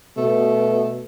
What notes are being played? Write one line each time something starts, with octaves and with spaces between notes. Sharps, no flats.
B2 A3